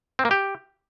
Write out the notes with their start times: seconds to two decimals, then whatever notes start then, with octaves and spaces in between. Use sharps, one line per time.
0.19 C4
0.25 A#3
0.31 G4